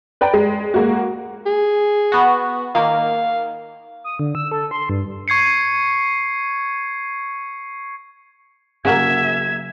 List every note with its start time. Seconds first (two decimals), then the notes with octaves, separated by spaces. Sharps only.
0.21 B4 D5 G5 A#5
0.33 G#3
0.74 G#3 A#3 F#4
1.46 G#4
2.12 B3 F#4
2.75 D#3 A#3 F5
4.04 D#6
4.19 D3
4.35 E6
4.52 A4
4.71 C6
4.89 G2
5.28 C#6 G#6 C7 C#7
8.85 C#3 F#3 A#3 E5 G#6